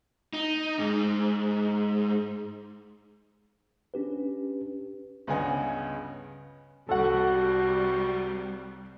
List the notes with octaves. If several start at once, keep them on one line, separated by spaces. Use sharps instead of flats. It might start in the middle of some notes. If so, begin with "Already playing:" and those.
D#4
G#2
C#4 D4 G4 B4
C#2 G2 C#3 B3 D#5 G#5
C2 G3 F#4 A4 F#5